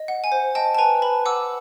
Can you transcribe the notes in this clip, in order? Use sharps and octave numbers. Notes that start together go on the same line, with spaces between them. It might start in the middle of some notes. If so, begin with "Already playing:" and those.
Already playing: D#5
F#5
G#5
C5
D#5 G5 A5
A5
B4 G#5 A#5
B4 A5 B5
F#5 D6 E6